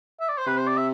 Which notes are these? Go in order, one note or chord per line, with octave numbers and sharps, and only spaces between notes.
E5
D5
C5
C3 B4
C5
D5
E5